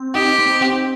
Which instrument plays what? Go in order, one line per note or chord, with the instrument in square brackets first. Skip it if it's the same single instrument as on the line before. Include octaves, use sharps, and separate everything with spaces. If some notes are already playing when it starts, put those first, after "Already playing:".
Already playing: [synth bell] C4
[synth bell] D#4 [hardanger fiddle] G4
[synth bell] C4
C4